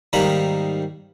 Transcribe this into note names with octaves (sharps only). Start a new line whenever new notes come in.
G#2 D#3 G3 A#3 A#5 B5